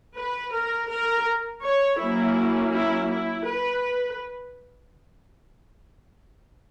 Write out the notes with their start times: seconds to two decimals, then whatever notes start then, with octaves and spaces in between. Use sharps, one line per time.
0.15 B4
0.53 A#4
0.89 A#4
1.64 C#5
2.00 F#3 A#3 C#4 E4
2.74 E4
3.11 E4
3.47 B4